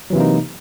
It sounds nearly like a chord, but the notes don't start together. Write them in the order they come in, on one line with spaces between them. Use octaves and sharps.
F#3 E3 C3 A#3 D#4